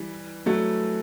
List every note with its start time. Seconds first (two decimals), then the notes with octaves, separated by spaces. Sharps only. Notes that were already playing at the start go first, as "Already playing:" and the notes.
Already playing: E3 G3
0.46 F#3 A3